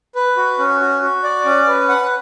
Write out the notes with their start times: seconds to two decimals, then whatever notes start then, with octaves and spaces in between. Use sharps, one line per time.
0.15 B4
0.37 F#4
0.59 C#4
0.80 F#4
1.02 F#4
1.23 D5
1.45 C#4
1.67 B4
1.89 F#5